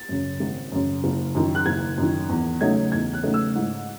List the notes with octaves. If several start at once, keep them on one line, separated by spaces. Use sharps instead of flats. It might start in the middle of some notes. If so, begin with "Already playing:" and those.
Already playing: A6
F#2 C#3
G#1
F#2 C#3
F#1
F#2 D#3
F#6
F#1 G#6
F#2 D#3
E2
C#3 F#3 A3 D#4 G#6
E2 G#6
F#6
C#3 F#3 A3 D#4
E6
G#2